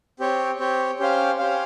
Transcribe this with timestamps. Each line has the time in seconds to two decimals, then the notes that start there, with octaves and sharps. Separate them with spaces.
0.19 C4 G4 C#5
0.59 C4 G4 C#5
0.99 C#4 G4 C5 F5
1.39 C#4 G4 C5 F5